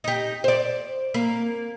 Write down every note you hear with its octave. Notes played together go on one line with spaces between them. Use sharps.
D#4 G4
C5 D5
A#3